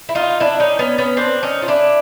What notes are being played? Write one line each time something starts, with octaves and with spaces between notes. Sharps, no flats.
E4
D#4 F4
D4 E4
C#4 D#4
B3 C#4
B3 C#4
C4 D4
C#4 D#4
F4
D4 E4